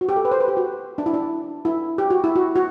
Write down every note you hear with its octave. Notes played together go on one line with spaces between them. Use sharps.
F#4
G4
A4
B4
C5
B4
G4
F#4
D4
E4
D4
E4
G4
F#4
E4
F#4
F#4